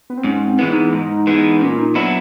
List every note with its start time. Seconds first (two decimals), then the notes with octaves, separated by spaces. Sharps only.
0.10 B3
0.17 C4
0.24 G#2 C#4
0.47 C4
0.59 E3 G#3 B3 E4
0.70 D#4
0.93 G#2 D#4
1.27 E3 G#3 B3 D#4
1.61 A#2 C#4
1.79 D#4
1.95 F#3 B3 D4 E4